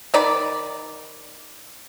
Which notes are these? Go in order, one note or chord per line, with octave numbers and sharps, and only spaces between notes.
D#3 D5 B5